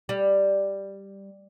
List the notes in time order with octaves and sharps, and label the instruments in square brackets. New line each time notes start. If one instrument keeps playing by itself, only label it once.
[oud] G3